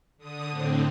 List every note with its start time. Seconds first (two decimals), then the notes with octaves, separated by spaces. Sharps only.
0.18 D3 D#6
0.50 A2 D3 C4